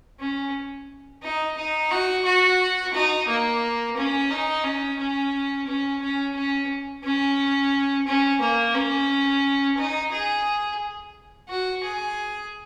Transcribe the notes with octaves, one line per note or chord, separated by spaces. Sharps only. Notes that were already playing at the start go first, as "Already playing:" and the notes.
C#4
D#4
D#4
F#4
F#4
D#4
A#3
C#4
D#4
C#4
C#4
C#4
C#4
C#4
C#4
C#4
A#3
C#4
D#4
G#4
F#4
G#4